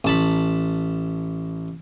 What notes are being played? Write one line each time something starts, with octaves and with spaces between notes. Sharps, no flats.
A1 A5 B5